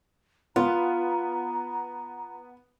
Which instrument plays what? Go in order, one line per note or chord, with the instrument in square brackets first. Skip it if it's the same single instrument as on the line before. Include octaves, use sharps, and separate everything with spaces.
[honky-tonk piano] B3 [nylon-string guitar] F4 [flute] A#5